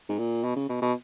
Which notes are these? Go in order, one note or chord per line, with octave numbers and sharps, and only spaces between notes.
G#2
A#2
B2
C#3
B2
B2